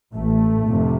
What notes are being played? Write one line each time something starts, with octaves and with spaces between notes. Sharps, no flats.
A1 A2 A3
F1 F2 C3